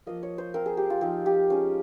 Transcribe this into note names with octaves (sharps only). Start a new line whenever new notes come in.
F3 A#3 F4 D#5
C#5
C5
F3 C4 F4 A#4
G#4
G4
F4
F3 C4 D#4 G4
G4
G#3 C#4 F4